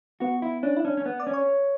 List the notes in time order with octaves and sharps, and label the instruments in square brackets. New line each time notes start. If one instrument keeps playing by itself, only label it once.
[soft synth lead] B3 [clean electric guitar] F#4
[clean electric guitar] E4
[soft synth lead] C#4 [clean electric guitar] D4
[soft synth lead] E4
[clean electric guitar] C#4 [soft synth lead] D4
[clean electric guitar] C#4
B3
[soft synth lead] D5
[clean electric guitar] C#4
[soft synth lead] C#5